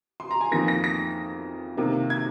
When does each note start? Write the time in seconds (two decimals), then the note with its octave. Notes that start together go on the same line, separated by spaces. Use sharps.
0.20 C6
0.31 A#5
0.41 G#5
0.51 F2 D#3 A#3 A#6
0.68 A#6
0.84 A#6
1.77 C3 D#3 A#3
2.10 G#6